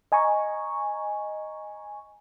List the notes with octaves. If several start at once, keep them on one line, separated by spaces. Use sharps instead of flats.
D#5 G#5 A#5 C#6